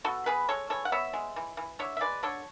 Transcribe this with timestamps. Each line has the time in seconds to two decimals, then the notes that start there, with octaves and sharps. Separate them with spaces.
0.04 B3 F#4 A4
0.26 B3 G#4 B4
0.49 G#3 A4 C#5
0.70 E3 A4 C#5
0.85 F#5
0.92 B3 C#5 E5
1.13 G#3
1.36 E3
1.57 E3
1.79 D3 C#5 E5
1.97 E5
2.01 G#3 B4 D5
2.23 D3 A4 C#5